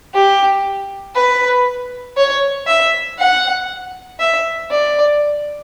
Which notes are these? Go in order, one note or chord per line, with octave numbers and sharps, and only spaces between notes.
G4
B4
C#5
E5
F#5
E5
D5